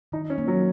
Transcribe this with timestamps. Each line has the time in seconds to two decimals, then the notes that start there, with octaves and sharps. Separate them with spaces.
0.12 D#3 D#4
0.30 C#4
0.38 A#3
0.48 F#3